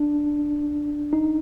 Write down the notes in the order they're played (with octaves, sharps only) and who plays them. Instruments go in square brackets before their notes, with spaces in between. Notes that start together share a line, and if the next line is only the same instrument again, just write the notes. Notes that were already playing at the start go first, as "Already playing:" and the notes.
Already playing: [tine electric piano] D4
D#4